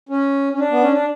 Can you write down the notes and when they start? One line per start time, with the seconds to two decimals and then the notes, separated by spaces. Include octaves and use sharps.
0.09 C#4
0.53 C#4
0.59 D4
0.71 B3
0.82 C#4
0.93 D4